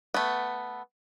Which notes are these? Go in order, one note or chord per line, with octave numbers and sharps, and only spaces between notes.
A3 B3